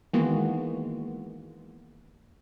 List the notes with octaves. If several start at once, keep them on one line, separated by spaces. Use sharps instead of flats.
D#3 E3 G#3 A#3 B3 F#4